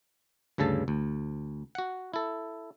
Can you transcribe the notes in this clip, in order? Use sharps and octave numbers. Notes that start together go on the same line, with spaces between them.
D2 G2 C#3 A4 A5
D2
F#4 F#5
E4 A4